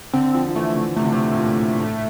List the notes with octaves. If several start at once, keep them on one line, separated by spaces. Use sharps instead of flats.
D3 C4
F3
F3
E3 A3
D3
C3 A3
D3
C3
A2
A#2
A2